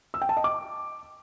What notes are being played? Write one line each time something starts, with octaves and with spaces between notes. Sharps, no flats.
E6
G5
A5
D#5
D6